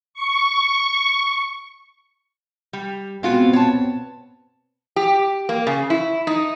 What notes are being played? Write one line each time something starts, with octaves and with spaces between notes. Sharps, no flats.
C#6
G3
B2 G#3 B3 C4 F4 F#4
C#5 A5
G4
A#3
C#3
E4
D#4